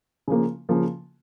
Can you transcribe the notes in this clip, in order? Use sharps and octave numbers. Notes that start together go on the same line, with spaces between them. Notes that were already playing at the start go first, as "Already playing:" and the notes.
C#3 F3 A#3
C#3 F3 A#3